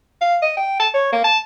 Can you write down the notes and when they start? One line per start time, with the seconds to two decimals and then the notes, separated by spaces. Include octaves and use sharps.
0.21 F5
0.42 D#5
0.57 G5
0.80 A5
0.94 C#5
1.12 A#3
1.24 A5